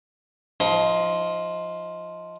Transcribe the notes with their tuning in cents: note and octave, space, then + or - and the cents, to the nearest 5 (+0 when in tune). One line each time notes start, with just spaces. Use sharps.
F3 +0 D#4 +20